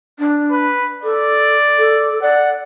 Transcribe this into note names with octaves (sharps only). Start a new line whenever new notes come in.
D4
B4
A4 D5
A4
D5 F#5